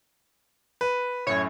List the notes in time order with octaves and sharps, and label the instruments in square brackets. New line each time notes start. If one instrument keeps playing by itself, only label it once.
[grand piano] B4
[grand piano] F#2 A2 [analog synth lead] C#5